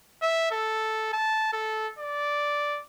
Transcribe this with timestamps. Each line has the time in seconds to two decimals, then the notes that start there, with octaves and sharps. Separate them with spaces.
0.22 E5
0.52 A4
1.13 A5
1.53 A4
1.99 D5